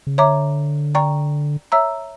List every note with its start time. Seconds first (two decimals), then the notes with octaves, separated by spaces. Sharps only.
0.07 C#3
0.18 D3 C#5 E5 A#5 D6
0.95 D5 G5 A#5 C#6
1.72 C#5 E5 A#5 E6